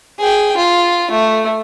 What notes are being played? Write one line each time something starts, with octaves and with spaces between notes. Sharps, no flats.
G#4 G5
F4
A3